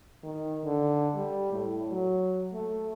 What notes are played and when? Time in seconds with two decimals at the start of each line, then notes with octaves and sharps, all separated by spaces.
0.23 D#3
0.65 D3
1.16 G3
1.52 A2
1.90 F#3
2.53 A3